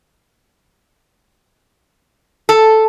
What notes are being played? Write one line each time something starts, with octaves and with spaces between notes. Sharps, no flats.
A4